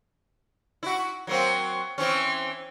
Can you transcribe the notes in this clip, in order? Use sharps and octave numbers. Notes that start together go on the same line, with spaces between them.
E4 F#4
F#3 A#3 C4
E3 C4 C#4